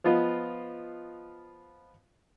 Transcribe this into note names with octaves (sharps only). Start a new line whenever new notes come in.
F3 B3 F4 D#5